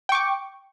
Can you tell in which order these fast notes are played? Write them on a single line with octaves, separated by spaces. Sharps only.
G5 C#6 D6